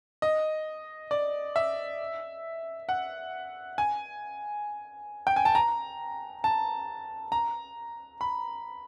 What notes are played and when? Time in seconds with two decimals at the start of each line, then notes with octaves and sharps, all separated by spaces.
0.22 D#5
1.11 D5
1.56 E5
2.89 F#5
3.78 G#5
5.27 G5
5.36 G#5
5.45 A5
5.55 A#5
6.44 A5
7.32 A#5
8.21 B5